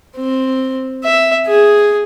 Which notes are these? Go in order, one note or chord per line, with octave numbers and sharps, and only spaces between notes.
C4
E5
G#4